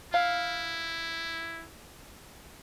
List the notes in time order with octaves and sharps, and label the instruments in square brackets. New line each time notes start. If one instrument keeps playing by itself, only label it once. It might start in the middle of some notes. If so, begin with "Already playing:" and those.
[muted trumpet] E4 [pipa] F5